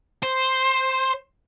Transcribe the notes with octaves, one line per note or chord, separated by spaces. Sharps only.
C5